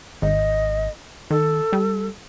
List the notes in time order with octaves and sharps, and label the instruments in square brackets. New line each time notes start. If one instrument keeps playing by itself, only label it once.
[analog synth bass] G#1 [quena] D#5
[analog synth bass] D#3 [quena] A4
[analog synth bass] G3